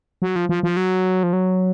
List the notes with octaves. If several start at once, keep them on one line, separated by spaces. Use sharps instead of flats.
F#3
F3
F3
F3
F#3
F3
F#3